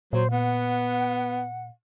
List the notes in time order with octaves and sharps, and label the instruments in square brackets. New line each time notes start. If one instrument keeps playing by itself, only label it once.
[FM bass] A#2 [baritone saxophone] F#3 [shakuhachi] C5
[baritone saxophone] B3 [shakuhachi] F#5